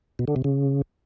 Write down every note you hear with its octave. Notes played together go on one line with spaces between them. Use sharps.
B2
D3
C3
C#3